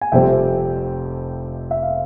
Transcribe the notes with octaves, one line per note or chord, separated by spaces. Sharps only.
G#5
F1 F2 C3 G3 C4 E5 G5
E5
F5